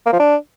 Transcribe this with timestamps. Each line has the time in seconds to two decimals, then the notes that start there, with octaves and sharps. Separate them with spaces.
0.06 A#3
0.13 F3
0.19 D4